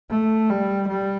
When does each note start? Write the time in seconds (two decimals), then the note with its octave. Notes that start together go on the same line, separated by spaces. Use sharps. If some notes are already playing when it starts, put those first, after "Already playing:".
0.10 A3
0.50 G3
0.89 G3